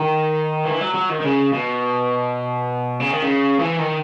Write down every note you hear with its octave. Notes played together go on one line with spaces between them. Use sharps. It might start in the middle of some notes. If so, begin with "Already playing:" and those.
Already playing: D#3
E3
F#3
F#3
D#3
D#3
C#3
B2
C#3
D#3
C#3
E3
D#3